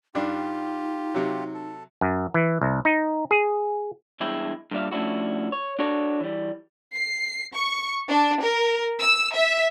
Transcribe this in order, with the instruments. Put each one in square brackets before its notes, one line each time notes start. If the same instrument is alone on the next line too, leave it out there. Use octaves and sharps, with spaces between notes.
[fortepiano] G2 D4 [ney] D#4 [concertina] F4 G4
[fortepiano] C3 F#3
[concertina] A4
[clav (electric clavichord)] F#2
E3
C2
D#4
G#4
[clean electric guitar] E2 G2 G#3 E4 G5
G2 A#2 G3 E5 F5
F3 A3 C#4 D4 E4 F#4
C#5
D4 F#4 A4 C#5
E3 G3
[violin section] C7
C#6
D4
A#4
E6
E5